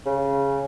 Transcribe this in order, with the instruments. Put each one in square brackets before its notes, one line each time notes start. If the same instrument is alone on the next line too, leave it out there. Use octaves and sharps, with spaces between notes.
[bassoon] C#3